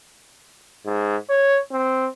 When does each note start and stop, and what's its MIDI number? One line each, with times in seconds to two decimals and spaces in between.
0.86 1.17 44
1.30 1.59 73
1.71 2.08 60